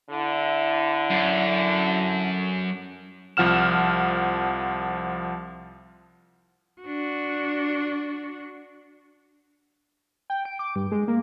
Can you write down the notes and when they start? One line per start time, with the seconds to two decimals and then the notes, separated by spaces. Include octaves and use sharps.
0.10 D3 E4
1.10 F#2
3.37 C2 F3 F#5 F6 E7
6.82 D4 F#4
10.30 G5
10.45 D7
10.59 D6
10.75 G2
10.92 G#3
11.08 A#3